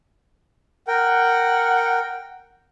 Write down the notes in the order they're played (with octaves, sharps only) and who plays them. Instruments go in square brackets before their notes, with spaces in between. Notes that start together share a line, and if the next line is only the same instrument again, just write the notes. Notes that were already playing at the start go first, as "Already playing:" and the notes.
[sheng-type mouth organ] A#4 G5 [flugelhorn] F#5